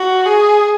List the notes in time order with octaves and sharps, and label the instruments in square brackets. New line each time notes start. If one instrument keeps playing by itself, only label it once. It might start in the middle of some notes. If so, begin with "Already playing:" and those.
Already playing: [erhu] F#4
G#4